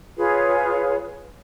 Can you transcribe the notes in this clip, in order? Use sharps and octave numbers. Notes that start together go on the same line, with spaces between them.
F4 G#4 B4 C#5